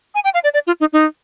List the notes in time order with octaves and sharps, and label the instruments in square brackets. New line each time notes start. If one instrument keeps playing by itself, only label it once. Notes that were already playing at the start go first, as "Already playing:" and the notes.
[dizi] G#5
G5
F5
D5
D5
F4
D#4
D#4